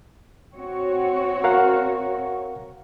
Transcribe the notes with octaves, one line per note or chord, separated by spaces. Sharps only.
C4 F#4 C#5
A#4 F5 F#5